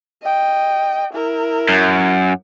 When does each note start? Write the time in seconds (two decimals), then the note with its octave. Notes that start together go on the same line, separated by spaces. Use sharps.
0.22 D#5 G5
1.13 E4 A#4
1.69 F#2